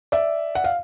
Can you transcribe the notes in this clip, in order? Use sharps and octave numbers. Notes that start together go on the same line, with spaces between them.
D5 E5
F#5
F5